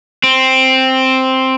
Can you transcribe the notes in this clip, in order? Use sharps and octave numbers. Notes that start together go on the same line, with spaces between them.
C4